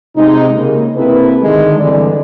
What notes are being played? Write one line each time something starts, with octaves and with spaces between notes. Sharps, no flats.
C3 G#3 D#4
C#3 A#3
C3 A#3 C4 E4 A4 B4
D3 D#3 G#3
G2 D3 E3 C4 D5